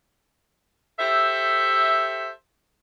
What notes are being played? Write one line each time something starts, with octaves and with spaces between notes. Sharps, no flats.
G4 A4 C5 E5